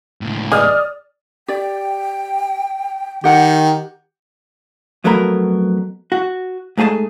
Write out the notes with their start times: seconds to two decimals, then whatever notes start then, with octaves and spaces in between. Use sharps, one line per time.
0.21 C#2 A2
0.52 G#4 D5 D#5 D#6 F6
1.48 G4 D5 G5
3.24 D#3 G4 F#5
5.04 F2 F#3 A3 B3 A#4 B5
6.12 F#4
6.77 G#2 A3 G#4 C5 A5